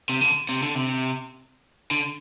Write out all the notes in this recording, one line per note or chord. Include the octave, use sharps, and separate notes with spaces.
C3
D3
C3
D3
C3
D3